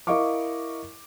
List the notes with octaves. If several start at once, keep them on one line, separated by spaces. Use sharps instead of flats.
E4 A#4 D#5 F5 C#6 D6